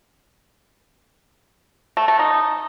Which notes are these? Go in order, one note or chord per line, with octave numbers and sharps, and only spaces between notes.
A3
A3
D#4